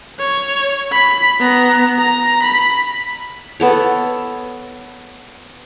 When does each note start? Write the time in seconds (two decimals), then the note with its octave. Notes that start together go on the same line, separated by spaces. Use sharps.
0.19 C#5
0.92 B5
1.40 B3 A#5
1.99 A#5
2.43 B5
3.60 B3 A4 C#5